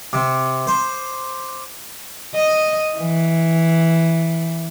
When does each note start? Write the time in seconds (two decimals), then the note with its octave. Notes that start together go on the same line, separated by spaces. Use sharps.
0.13 C3 D6
0.67 C5
2.35 D#5
2.98 E3